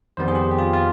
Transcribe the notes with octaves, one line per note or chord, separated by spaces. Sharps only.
F2 D#3 G3 B3 C5
G#4
G4
G4
F4
F4